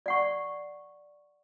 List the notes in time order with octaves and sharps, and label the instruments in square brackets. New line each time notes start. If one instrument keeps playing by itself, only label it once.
[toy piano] D5 F#5 C#6